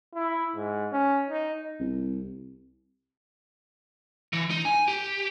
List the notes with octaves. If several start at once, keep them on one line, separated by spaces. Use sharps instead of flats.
E4
G#2
C#4
D#4
C2
E3
D#4
G#5
G4